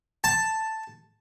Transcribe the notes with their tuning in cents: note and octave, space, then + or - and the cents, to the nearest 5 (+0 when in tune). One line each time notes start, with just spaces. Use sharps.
A5 +5